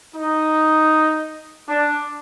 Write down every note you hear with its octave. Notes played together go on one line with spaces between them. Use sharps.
D#4
D4